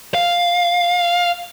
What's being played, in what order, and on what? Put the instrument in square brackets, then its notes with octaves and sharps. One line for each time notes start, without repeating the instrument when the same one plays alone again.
[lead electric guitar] F5